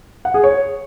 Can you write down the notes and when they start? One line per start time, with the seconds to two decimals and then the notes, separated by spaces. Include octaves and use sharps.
0.25 F#5
0.34 G#4
0.44 C#5